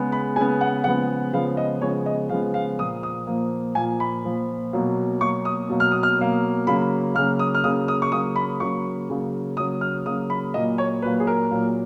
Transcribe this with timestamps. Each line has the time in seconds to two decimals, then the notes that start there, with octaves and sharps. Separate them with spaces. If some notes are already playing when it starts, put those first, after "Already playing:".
Already playing: C#3 G#3 B3
0.12 B5
0.36 C#3 G#3 B3 G#5
0.61 F#5
0.84 C#3 F3 G#3 B3 F#5
1.33 C#3 F3 G#3 B3 F5
1.57 D#5
1.81 C#3 F3 G#3 B3 C#5
2.06 D#5
2.29 C#3 F3 G#3 B3 F5
2.54 F5
2.79 A#2 F3 A#3 D#6
3.03 D#6
3.27 A#2 F3 A#3
3.75 A#2 F3 A#3 G#5
4.00 B5
4.23 A#2 F3 A#3
4.73 B2 F#3 A#3
5.20 B2 F#3 A#3 C#6
5.45 D#6
5.69 B2 F#3 A#3
5.80 F6
5.92 D#6
6.03 F6
6.19 B2 F#3 A#3
6.67 C#3 F#3 A#3 B5
7.15 C#3 F#3 A#3 F6
7.39 D#6
7.55 F6
7.64 C#3 F#3 A#3 D#6
7.88 D#6
8.02 C#6
8.12 C#3 F#3 A#3 D#6
8.36 B5
8.60 C#3 F#3 A#3 C#6
9.10 C#3 F#3 A#3
9.57 C#3 F#3 A#3 D#6
9.81 F6
10.06 C#3 F#3 A#3 D#6
10.30 B5
10.54 A#2 F#3 A#3 D#5
10.78 C#5
11.02 A#2 F#3 A#3 B4
11.20 G#4
11.27 A#4
11.51 A#2 F#3 A#3